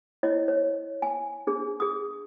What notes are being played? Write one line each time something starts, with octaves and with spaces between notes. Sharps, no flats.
E4 C#5 D#5
C#5
G#5
D4 G#4
G#4 D#6